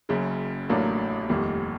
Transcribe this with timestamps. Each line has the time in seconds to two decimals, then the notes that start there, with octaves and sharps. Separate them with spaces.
0.09 F#1 F#2 C#3
0.69 A1 A2 F#3 A#3 D4
1.29 F1 D#2 D#3 G3